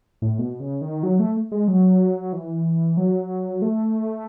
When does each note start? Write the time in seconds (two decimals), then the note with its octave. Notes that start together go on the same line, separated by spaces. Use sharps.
0.22 A2
0.39 B2
0.60 C#3
0.81 D#3
1.03 F#3
1.20 A3
1.52 G#3
1.68 F#3
2.33 E3
2.97 F#3
3.62 A3